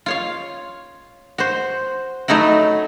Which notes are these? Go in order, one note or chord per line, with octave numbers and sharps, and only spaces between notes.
F4 C#5 F5
F#4 C5
F#3 A3 D#4 E4 F#4